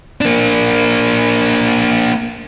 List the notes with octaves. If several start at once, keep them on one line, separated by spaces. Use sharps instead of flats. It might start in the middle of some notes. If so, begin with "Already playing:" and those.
A#3 D4